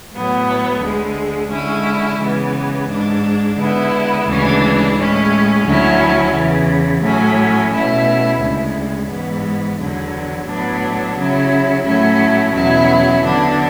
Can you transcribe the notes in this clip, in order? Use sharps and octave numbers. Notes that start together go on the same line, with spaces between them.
A2 F#3 B3
D2 D3 G#3
D3 G#3 C#4 E4
C#3 E3 G#3 B3
G#2 G#3 D4
D3 G#3 B3 E4
D2 C#3 E3 G#3 D4
A2 G#3 C#4
D2 D3 F#3 C#4 E4
E2 C#3 E3
A2 F#3 A3 C#4
B2 A3 C#4 E4
D2 C#3 G#3
G#2 E3 B3
E2 D3 F#3
A2 F#3 B3 D4
C#3 F#3 C#4 E4
A2 F#3 A3 C#4 E4
E2 B2 F#3 C#4 E4
D3 F#3 B3 D4